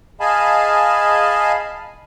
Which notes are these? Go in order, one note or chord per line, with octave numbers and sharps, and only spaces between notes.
G#4 D#5 F5 G#5 A5 B5